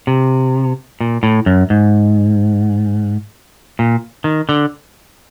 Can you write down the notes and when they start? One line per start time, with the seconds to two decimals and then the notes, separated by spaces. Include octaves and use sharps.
0.07 C3
1.01 A#2
1.23 A2
1.46 F#2
1.70 G#2
3.79 A#2
4.24 D#3
4.49 D3